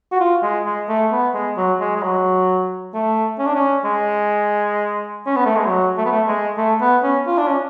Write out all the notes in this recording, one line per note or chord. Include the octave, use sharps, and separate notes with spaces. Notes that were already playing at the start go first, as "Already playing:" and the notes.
F#4
F4
G#3
G#3
A3
B3
G#3
F#3
G#3
G#3
F#3
A3
C#4
D4
C#4
G#3
C#4
B3
A3
G#3
F#3
A3
B3
A3
G#3
A3
B3
C#4
F4
D4
C#4